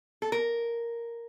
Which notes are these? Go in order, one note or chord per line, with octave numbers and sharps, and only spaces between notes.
A4
A#4